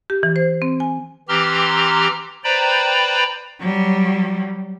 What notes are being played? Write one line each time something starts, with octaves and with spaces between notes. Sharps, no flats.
G4
E3
C5
C4
G#5
E3 C4 G4 A#5 C6 F6
B4 C5 D5 G5 A#5 B5
F#3 G3